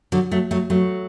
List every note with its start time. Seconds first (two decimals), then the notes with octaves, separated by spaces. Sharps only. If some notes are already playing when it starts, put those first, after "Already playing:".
0.12 D3 F#3
0.31 F#3 A3
0.51 F#3 A3
0.70 F#3 A3